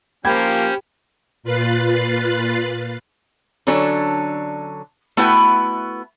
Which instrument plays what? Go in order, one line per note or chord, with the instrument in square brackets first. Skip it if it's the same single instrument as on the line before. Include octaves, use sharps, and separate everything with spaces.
[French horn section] F3 A#3 [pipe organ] C#4 C5 [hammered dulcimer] G4 [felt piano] G5 B5 G#6
[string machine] A#2 F4 B4 F#6 A6 C7
[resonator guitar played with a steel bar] D3 F#3 C#4 D4 A4
A3 B3 E4 F#4 B4 G5